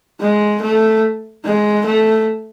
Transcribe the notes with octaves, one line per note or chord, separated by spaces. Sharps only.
G#3
A3
G#3
A3